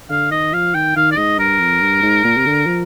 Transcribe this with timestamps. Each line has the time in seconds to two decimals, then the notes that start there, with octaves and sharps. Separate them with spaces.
0.10 D3 F5
0.31 D#3 D#5
0.53 F3 F5
0.75 D#3 G5
0.96 D#3 F5
1.12 D5
1.17 G#2 D#5
1.38 G2 A#4
1.59 F2
1.81 G2
2.02 G#2
2.24 A#2
2.37 C3
2.46 D3
2.67 F3